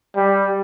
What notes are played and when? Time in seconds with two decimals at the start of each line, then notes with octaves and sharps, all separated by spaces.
0.16 G3